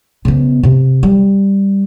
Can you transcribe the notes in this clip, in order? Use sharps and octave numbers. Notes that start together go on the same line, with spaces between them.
C#3 B3
C3
G3